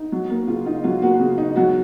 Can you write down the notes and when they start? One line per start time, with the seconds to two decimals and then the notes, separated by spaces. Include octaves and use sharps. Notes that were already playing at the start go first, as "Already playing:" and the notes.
Already playing: D#4
0.12 F#3
0.30 A#3
0.47 C#3 F4
0.66 D#4 F4
0.84 F#3 F4
1.02 A#3 F#4
1.20 C#3
1.38 D#4
1.56 F#3 F#4